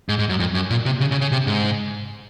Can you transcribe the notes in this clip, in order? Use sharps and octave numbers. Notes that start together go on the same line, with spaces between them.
G#2
G#2
F#2
F2
F#2
A#2
C3
C#3
C#3
C#3
C3
G#2